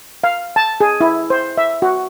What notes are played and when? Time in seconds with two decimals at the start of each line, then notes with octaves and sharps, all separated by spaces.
0.24 F5
0.56 A5
0.81 G#4
1.01 E4
1.30 C5
1.57 E5
1.82 F#4